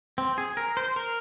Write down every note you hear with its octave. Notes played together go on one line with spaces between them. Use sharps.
C4
G#4
A#4
C5
A#4